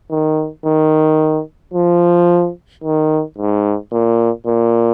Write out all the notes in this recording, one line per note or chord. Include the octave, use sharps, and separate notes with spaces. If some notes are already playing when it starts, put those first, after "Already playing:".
D#3
D#3
F3
D#3
G#2
A#2
A#2